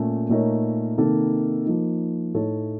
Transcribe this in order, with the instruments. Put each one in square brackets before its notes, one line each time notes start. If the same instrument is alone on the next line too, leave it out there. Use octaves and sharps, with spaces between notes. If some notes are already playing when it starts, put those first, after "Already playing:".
Already playing: [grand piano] A#2 A3 C#4
A#2 A3 D#4 A#4 C#5
C3 D#3 A#3 D#4 A4
F3 A#3 D#4
A2 A3 D#4 A4 C#5